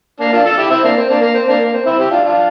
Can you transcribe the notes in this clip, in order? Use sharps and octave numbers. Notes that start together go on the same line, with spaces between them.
A#3 D4
D4 F4
F4 A4
E4 G4
C4 E4
A#3 D4
C4
A#3 D4
A#3
C4
A#3 D4
A#3
C4
C4 E4
E4 G4
D4 F4
D4 F4